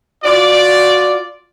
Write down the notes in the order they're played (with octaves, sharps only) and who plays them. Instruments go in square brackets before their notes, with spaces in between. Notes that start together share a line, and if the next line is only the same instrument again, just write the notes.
[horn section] F4 F#4 D5